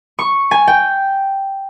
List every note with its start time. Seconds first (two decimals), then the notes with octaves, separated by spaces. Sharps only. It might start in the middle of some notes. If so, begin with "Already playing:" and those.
0.19 C#6
0.51 G#5
0.67 G5